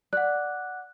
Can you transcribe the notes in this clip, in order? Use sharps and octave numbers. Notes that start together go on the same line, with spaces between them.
D5 F#5 F#6